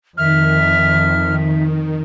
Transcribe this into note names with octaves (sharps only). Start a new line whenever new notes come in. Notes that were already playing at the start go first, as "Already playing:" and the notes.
F2 D#3 E5 F6